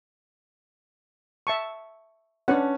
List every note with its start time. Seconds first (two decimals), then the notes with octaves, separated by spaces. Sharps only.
1.47 E5 A5 C#6
2.48 C#4 D4 B4 F#5